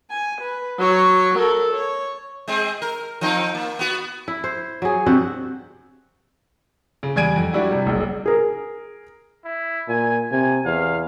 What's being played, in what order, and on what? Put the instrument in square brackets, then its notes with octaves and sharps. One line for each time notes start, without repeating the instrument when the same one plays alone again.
[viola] G#5
B4
F#3 C#5
A4 A#4
C#5
[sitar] G#3 C4 G#4
A#4
F3 C4 D#4
A#3
B3 F#4
[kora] E4
C5
F#3 G#4
G2 C3 C4 F#4
[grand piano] C#3
E2 G3 G#5 G#6 D7 D#7
F2
G3 D4 E4 F#4 G4
C3 G3
F#1 B1
[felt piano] G#4 A#4
[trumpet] E4
[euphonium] A#2 [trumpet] G#5
[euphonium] C3 [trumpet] G#5
[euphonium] E2 [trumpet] F5